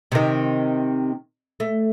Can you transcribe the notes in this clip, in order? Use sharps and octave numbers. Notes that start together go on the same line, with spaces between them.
C3 D#3
A3